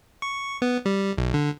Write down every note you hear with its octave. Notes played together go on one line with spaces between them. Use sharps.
C#6
B3
G3
B1
D3